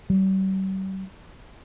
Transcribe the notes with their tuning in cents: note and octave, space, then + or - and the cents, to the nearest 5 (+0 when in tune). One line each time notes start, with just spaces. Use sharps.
G3 -45